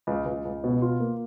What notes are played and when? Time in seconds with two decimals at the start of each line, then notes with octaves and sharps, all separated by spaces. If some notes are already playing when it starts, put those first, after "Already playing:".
0.07 C#2
0.25 C#2
0.45 C#2
0.64 B2
0.82 F4
1.00 A#3